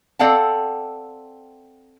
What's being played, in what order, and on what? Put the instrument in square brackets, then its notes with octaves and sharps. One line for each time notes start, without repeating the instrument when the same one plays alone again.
[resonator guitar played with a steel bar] C4 A4 D5 F5 F#5 A5